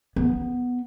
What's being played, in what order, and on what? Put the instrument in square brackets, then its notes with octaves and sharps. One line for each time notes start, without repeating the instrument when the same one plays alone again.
[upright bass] B3